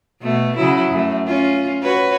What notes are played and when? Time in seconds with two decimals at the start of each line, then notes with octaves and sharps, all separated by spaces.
0.22 B2 A3
0.56 C#3 F#3 E4
0.91 F#2 A3
1.27 C#4 F4
1.83 F#4 B4 C#5